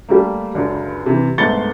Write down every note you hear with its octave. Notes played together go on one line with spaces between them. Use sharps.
G3 A3 A#3
C#2 F#2 D3
C3 E3
G1 G#2 A3 A6 C#7 G7